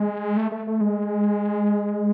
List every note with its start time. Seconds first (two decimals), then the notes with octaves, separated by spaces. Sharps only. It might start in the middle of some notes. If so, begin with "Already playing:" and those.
Already playing: G#3
0.37 A3
0.52 A3
0.67 A3
0.81 G#3